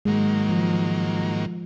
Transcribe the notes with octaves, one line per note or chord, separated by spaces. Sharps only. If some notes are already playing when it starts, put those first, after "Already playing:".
G#2 D#3 F#3 G#3 A#3
F3